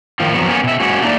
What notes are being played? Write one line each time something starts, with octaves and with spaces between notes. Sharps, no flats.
A2 D#3 F3 F4
F2 F#3 B3
A#3 B3 C#4
B2 E5
G#3 A#3 C#4 F#4
A3 A#3 D4 D#4 C5 D5